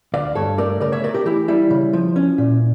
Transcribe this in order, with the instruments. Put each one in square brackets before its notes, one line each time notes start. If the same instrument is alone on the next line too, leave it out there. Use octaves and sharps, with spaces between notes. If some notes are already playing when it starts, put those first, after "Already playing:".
[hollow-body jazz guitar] D2 D5 F5
G2 A4 C#5
A3 A#4 D5
C#3 A#4 D5
C#5 E5
A3 A#4 D5
G4 A#4
E3 E4 G4
G3 E4
C#3
F3
C#4
A#2